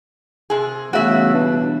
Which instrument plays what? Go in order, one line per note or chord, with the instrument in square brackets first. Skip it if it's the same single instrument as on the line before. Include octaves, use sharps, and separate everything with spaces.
[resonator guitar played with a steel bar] C3 G#4
[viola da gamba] G2 E3 B3 [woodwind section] C#3 A3 [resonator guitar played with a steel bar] F#4 E5
[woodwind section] B2 D4